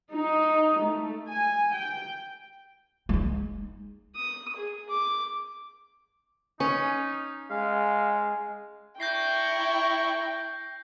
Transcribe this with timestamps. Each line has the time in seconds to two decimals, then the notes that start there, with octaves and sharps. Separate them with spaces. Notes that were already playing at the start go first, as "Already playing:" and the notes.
0.13 D#4
0.81 A3
1.28 G#5
1.72 G5
3.09 G#3 D#4
4.16 D#6
4.56 G#4
4.90 D6
6.60 C#4 D#4
7.50 G#3 F5
9.00 D4 E4 G5 A#5 C#6 G6 A#6 C7